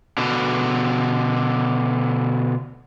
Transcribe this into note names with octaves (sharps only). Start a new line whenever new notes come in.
B2 D3